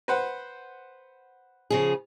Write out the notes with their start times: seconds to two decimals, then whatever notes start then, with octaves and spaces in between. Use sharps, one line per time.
0.08 B4 C5 F#5
1.70 C#3 F3 G#4